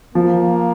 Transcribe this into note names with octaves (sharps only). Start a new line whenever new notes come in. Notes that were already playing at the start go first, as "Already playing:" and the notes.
F3 A#3